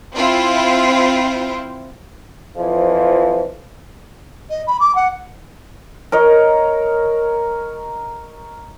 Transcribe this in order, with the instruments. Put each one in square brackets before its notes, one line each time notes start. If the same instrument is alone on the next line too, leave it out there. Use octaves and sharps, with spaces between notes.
[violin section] C4 E4 F4
[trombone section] F2 E3 F3
[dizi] D#5
B5
D6
F#5
[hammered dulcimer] A#4 C#5 D#5